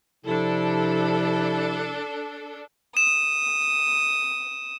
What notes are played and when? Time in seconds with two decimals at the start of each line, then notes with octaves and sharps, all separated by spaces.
0.25 C3 F3 D4 E4 A4
2.97 D#6 E7